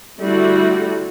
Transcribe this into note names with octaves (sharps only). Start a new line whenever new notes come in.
D3 G3 A3 E4 F#4